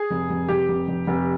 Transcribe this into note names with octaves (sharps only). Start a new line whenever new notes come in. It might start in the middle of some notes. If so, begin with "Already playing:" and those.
Already playing: G#4
F1
F1
F1 G4
F1
F1
F1